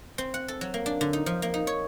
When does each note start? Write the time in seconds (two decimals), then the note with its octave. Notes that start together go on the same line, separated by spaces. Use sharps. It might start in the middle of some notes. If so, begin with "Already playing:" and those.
0.18 C4
0.34 F#5
0.48 A4
0.61 F#3
0.74 A#3
0.86 D4
1.01 D3
1.13 D#4
1.26 F3
1.42 A#3
1.54 D#4
1.67 C#5